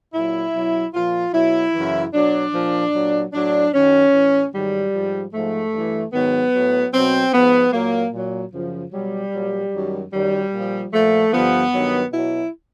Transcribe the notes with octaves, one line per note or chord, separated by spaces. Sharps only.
A#2 F#3 E4
B2 F#3
A#2 F3 F4
B2 F#3 E4
F#2 C#3 E3
B2 F#3 D4
A#2 F3
A#2 F#3
A2 F#3 D4
F#2 D#3 F#3 C#4
A2 E3
G#2 D#3 F#3 G3
G#2 F3
G#2 F3 A3
G2 E3
G#2 D#3 F#3 B3
A2 F#3
B2 F#3 C4
G#2 F3 B3
A#2 F#3 A#3
A#2 F#3
F#2 C#3 F3
B2 F#3 G3
A#2 F#3
F#2 D#3 F#3
F#2 D#3 F#3 G3
A#2 F3
A#2 F3 A3
G2 D3 F3 B3
G2 D#3 F#3
B2 F#3 E4